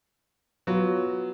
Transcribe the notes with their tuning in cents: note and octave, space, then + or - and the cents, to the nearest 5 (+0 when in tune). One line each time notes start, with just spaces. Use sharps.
F#3 +0 B3 +0 F4 +0